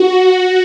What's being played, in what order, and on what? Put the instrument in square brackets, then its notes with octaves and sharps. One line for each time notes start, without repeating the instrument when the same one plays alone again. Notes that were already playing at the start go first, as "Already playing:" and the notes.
Already playing: [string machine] F#4